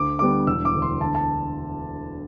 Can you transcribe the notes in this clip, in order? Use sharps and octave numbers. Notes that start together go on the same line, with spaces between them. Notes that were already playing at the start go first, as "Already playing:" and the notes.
Already playing: D2 D6
D3 G3 B3 D6
E1 E6
D6
D2 D3
C6
D2 A5
A5